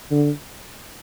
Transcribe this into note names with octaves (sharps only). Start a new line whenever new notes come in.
D3